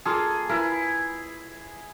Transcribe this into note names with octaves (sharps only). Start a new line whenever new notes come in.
A#3 F4 G#4 A4
E4 A#4 B4